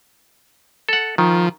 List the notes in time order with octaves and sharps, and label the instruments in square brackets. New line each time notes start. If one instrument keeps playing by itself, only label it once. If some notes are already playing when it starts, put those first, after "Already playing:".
[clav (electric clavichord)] A4 F#5
[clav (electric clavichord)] D#3 [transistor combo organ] F3